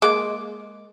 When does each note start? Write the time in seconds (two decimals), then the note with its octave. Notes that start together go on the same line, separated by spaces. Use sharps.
0.02 G#3 A#3 D6